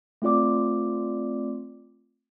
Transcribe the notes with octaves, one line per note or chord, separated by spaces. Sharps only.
A3 C4 F4 D5 D6